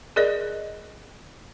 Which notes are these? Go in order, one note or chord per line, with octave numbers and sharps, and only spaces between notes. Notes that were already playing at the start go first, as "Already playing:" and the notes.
G#4 A#4 D5 D#5